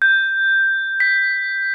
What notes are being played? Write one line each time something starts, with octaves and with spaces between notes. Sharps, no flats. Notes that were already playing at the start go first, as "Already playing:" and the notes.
G6
B6